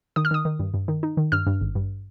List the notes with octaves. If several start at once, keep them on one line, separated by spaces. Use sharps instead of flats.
D#3 D#6
F6
D#3 D#6
D#3
G2
G2
D#3
D#4
D#3
G2 F6
G2
G#1
G2